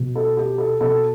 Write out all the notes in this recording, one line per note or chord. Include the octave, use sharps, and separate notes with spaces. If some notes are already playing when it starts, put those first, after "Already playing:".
Already playing: B2
A4
G4
A4
B2 A4